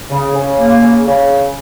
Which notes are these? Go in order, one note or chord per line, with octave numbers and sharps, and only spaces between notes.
C#3
C#3
A#3
C#3
C#3